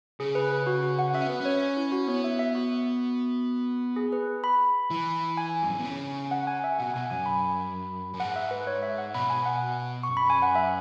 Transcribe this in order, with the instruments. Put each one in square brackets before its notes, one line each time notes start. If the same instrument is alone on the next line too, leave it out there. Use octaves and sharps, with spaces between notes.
[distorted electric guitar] C#3 [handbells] G#4
[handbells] B4
B4
F#4
F#4
F#5
[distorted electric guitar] C#4 [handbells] E5
[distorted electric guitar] B3 [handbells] B4
[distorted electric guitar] C#4 [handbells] C#5
[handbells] E4
F#4
[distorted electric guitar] B3 [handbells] C#5
[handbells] E5
E5
F#4
G#4
B4
B5
[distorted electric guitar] E3
[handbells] G#5
[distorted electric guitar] F#2
G#2
B2
C#3
[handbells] F#5
G#5
E5
[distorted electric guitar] B2 [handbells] F#5
[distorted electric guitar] B2 [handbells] G#5
[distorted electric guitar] F#2 [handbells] G#5
[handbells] B5
[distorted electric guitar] F#2
[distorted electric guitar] G#2 [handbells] F#5
[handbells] E5
B4
C#5
E5
F#5
[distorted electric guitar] B2 [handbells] B5
[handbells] G#5
F#5
[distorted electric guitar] F#2 [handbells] C#6
[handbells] B5
G#5
F#5
E5